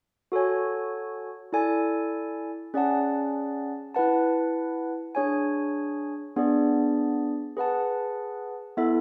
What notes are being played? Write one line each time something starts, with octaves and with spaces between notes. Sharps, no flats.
F#4 A4 C#5 G#5
E4 A4 D5 G#5
C#4 G#4 D5 F#5 A5
E4 B4 F#5 A5
D4 G#4 C#5 G#5
B3 D4 G#4 D5
G#4 B4 F#5 A5
B3 E4 A4 E5